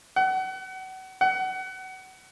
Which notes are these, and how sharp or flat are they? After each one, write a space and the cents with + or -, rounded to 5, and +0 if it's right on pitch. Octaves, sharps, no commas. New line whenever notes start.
F#5 +30
F#5 +25